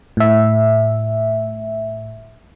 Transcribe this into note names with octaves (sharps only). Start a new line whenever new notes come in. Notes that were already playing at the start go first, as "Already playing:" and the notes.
A2 E5